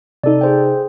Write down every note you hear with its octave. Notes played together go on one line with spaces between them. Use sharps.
C3 D#4 A4 D5
G#4 C5 G5